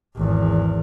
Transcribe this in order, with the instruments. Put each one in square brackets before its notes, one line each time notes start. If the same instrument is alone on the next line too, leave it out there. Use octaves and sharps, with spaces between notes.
[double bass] G#1 E2